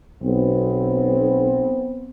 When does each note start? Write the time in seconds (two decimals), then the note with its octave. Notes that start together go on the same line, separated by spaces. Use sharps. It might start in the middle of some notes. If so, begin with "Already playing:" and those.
0.23 B1 B3 C4